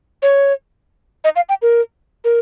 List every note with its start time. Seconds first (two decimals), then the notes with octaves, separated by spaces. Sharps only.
0.22 C#5
1.24 D#5
1.36 F5
1.49 G5
1.62 A#4
2.24 A#4